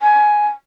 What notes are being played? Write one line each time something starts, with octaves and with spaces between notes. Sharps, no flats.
G#5